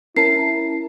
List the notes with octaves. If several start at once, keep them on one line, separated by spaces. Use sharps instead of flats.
C#4 E4 A#4 A5 C7